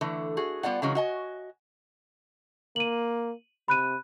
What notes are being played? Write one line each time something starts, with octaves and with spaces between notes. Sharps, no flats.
D3 E3 A3
F#4 G#4
G3 B3 F4 D5 F#5
C#3 E3 F#3 G#3 C#4
F#4 D#5 G#5
A#3 D#7 F#7
C3 B5 F#6 D#7